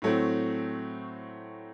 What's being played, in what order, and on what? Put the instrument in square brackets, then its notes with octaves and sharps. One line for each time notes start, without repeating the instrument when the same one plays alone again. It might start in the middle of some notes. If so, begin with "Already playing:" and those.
[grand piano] A2 F#3 A3 C4